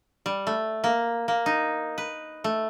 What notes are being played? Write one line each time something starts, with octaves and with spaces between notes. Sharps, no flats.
G3
A3
A#3
A#3
D#4
B4
A3